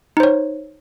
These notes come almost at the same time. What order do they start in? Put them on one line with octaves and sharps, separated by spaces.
D#4 C5 C#5